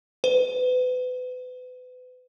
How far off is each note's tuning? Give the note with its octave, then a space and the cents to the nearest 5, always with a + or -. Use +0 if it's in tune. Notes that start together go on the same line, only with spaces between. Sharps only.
B4 +35